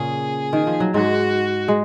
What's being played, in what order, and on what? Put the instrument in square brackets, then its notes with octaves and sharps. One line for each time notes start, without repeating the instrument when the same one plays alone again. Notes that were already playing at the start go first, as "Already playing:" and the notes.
Already playing: [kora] A#2 C#3 [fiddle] G#4
[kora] D#3
F3
F#3
[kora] G#2 G#3 [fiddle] F#4
[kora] G#3